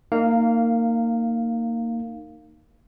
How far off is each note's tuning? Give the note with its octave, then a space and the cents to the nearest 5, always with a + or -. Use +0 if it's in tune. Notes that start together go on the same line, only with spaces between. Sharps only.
A#3 -20 D#4 -20 F5 +0